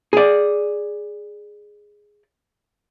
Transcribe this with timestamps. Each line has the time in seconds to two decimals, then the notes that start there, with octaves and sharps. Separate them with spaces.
0.13 G#4 D5